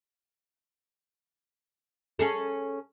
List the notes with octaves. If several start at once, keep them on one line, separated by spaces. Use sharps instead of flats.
C#4 G#4 A4